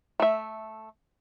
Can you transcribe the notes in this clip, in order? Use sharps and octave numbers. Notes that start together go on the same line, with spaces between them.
A3 E5